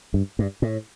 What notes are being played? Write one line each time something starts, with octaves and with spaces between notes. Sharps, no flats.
G2
G2
A2